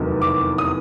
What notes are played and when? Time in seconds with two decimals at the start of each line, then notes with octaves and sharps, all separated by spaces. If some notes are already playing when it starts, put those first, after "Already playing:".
Already playing: F1 E2 C3 D#3 F#3
0.22 D6
0.58 D#6